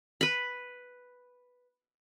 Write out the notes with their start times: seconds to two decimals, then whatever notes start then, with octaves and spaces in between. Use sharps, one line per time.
0.21 B4 B5